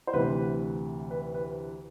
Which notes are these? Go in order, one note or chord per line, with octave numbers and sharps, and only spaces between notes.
C5
D2 C3 E3 B4
B4
B4